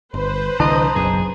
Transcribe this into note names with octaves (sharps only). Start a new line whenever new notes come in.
G1 B4 C5
C2 D3 E3 D#5 A5 A#5 C6
F#1 B1 F#2 G#4